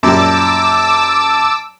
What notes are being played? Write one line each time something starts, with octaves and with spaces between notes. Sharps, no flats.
F#2 A#2 G3 A5 D6 E6